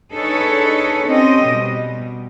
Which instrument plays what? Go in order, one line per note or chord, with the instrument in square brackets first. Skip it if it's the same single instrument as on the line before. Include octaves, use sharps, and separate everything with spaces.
[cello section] D4 D#4 G#4 A4 B4 C#5
C4 C#4 G4 D#5
B2 G3